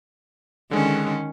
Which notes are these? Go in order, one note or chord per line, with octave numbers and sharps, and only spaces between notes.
D3 D#3 G#3 C#4